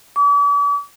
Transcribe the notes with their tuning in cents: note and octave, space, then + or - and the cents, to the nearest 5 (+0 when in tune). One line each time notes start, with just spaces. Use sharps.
D6 -45